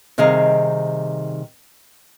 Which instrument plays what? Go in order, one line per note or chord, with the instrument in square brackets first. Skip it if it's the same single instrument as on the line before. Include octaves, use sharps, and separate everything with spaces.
[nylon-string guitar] C3 D#3 G3 G#4 D#5 F5